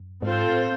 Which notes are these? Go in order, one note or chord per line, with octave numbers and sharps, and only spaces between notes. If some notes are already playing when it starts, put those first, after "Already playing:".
Already playing: F#2
G#2 C4 F4 A4 C5
A2